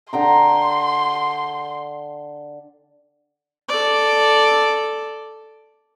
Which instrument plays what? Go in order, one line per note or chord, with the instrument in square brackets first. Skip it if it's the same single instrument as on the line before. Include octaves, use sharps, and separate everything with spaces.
[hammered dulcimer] D3 G5 A#5 [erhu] C6
[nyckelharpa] A4 D5